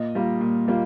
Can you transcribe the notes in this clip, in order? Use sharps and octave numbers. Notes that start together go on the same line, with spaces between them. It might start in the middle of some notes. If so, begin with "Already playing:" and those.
Already playing: A#2 D#5
G3 A#3 F4
A#2
G3 A#3 F4